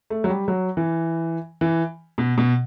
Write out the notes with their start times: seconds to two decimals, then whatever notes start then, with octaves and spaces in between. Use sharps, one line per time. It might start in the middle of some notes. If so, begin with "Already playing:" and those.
0.10 A3
0.24 F#3
0.30 G3
0.48 F#3
0.77 E3
1.61 E3
2.18 B2
2.38 B2